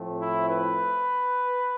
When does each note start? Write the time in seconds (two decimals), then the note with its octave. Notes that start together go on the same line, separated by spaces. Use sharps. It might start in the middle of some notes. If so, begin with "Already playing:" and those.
Already playing: A2 F3 A3 C4
0.19 E4
0.49 B4